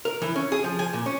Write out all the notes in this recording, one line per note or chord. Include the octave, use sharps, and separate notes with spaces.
A#4
E3
C#4
G#4
F3
G#5
A#2
C#4